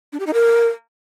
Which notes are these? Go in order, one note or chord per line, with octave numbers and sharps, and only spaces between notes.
D4
G4
D#4
A#4